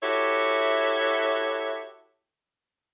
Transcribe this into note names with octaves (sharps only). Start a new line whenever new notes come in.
E4 F#4 G4 A4 C#5 E5